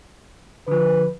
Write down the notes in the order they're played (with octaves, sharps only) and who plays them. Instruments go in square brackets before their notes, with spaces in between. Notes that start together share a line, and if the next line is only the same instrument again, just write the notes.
[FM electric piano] D3 F3 [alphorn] B4